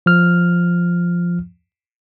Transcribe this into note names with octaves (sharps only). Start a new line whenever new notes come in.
F3 F6